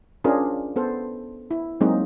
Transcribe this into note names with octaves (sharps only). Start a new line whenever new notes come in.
C#4 D4 F4 G#4 A#4 C5
B3 A4 C5
E4
F#3 G#3 A#3 C4 D#4 G#4